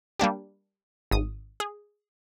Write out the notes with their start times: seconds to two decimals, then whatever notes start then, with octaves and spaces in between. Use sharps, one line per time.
0.19 G3 A#3 D4 G4
1.11 G#1 D#6
1.60 G#4